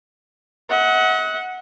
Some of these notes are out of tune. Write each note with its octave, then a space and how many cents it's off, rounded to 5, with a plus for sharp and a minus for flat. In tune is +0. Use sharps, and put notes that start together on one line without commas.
D#5 +45 F#5 +0